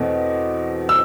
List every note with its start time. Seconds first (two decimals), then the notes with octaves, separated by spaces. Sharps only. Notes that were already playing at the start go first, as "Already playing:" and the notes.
Already playing: E2 B2 A3 C4
0.89 E6